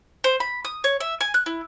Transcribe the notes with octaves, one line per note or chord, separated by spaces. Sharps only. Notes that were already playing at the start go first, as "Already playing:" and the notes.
C5
B5
D#6
C#5
E5
G#5
F#6
E4